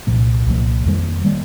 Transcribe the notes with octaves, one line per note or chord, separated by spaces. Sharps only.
C2 A#2 F3 A#3
C2 A#2 F3 A#3
F2 D#3 G3 A#3
D#3 G3 A#3